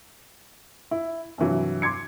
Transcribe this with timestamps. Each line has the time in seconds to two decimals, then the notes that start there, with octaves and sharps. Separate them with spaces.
0.91 E4
1.38 G2 C3 E3 F#3
1.82 C6 D6 G#6 C#7